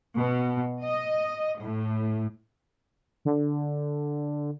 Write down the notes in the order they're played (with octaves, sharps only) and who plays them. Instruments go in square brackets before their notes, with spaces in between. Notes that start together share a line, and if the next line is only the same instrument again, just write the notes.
[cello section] B2
D#5
A2
[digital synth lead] D3